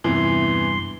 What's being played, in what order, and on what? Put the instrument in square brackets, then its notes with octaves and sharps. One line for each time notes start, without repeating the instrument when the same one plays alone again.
[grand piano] E2 C3 E3 [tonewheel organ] G2 C6